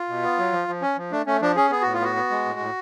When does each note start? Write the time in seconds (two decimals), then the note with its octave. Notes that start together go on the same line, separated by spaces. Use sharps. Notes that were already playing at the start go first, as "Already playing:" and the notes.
Already playing: F4
0.09 B2
0.23 B3
0.38 F#3
0.52 F3
0.68 F3
0.82 C#4
0.97 F3
1.12 A3 D4
1.26 A3 C#4
1.41 F3 D4
1.56 C#4 G#4
1.70 B3 G#4
1.82 A2 F#4
1.93 F4
2.00 B3 F#4
2.16 B3
2.30 G#3
2.45 A2
2.59 A2